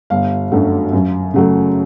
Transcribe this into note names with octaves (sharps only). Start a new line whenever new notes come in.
G1 F5
F#2 D3 F#3 A3
F#2
C#3 F#3 A3